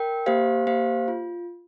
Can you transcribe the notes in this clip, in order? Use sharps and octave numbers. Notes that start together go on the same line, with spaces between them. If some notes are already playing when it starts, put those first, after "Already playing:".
Already playing: A#4 G5
A#3 G4 C5 F5
A#3 G4 C5 F5
F4